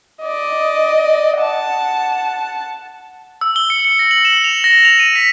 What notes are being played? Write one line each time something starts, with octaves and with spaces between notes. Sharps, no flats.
D5 D#5
F#5 A5
E6
G7
C#7
C#7
A#6
F#7
E7
F7
A#6
F7
D#7
B6